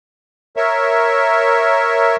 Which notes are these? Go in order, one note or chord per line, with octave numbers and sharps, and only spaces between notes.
A#4 C#5 E5